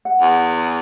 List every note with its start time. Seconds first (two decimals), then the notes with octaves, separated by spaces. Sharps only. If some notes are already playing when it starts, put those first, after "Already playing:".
0.05 F#5
0.21 E2